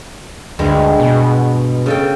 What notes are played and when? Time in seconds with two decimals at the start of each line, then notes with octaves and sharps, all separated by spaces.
0.59 D2 G2 G#3
1.00 B2
1.86 C#3 A4 G5